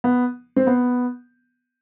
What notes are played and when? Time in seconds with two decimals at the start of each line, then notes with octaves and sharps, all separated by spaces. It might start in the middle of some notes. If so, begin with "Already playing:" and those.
0.04 B3
0.56 C4
0.67 B3